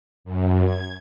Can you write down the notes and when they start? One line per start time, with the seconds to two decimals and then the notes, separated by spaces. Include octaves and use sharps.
0.24 F#2
0.64 G#6